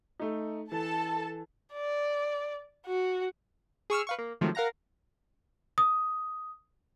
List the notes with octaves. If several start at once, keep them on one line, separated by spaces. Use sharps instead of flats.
A3 D#4
E3 A4 A5
D5
F#4
G#4 C#6 E6 F6
B4 F5 C#6
A#3
C3 D#3 F3 F#3 G#3 A3
A#4 F5 F#5 A#5 A#6
D#6